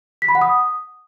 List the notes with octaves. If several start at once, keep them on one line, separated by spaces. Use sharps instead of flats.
B6
B5
F#5
D#6